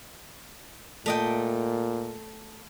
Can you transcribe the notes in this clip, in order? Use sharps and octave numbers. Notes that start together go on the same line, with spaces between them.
A#2 A3 D#5 G5